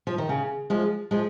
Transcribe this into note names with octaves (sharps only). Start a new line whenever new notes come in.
F3
D#3
C#3
F3 G#3
F3 G#3